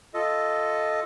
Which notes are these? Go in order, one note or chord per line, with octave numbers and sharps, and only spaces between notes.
F4 A4 D#5